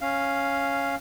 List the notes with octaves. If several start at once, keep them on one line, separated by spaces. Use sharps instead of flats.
C#4 F5